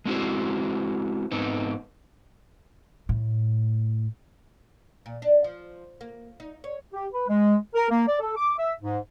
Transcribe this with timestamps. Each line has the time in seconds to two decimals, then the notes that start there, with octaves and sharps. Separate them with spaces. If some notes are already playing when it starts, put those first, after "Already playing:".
0.05 G#3 A3 C4 E4 F#4 C5
1.32 G#2 B3 C4 D#4
3.09 A2
5.06 A#2
5.22 D4
5.44 F3
6.01 A#3
6.40 D#4
6.64 C#5
6.93 G4
7.13 B4
7.28 G#3
7.75 A#4
7.90 A#3
8.07 D5
8.20 A4
8.36 D6
8.58 E5
8.81 G#2